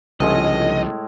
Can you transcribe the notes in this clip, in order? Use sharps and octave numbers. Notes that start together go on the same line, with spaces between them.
G1 C2 A2 C#3 F3 G#3 C#4 D#5